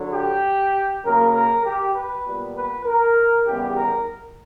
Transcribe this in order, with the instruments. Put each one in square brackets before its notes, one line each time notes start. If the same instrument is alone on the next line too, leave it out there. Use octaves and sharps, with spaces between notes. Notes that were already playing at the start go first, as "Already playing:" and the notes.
Already playing: [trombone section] D3 F#3
G4
C#3 F#3 A#3 A#4
A#4
G4
B4
A#2 G3 B3
B4
A#4
E2 C#3 G3 B3 G4
A#4